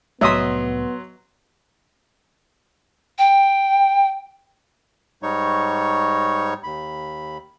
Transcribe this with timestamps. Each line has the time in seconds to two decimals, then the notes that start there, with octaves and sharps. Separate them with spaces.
0.21 C2 A2 F#3 B3 D#5 E5 C6 D#6
3.18 G5
5.23 G#2 G3 D#4 C#5 C#6
6.63 D#2 B5